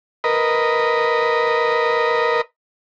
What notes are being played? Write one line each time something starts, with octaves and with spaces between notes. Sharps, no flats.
A#4 B4 D#5